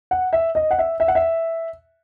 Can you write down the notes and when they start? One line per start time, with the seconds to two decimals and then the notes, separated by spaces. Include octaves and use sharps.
0.11 F#5
0.33 E5
0.55 D#5
0.71 F#5
0.79 E5
1.00 E5
1.08 F#5
1.15 E5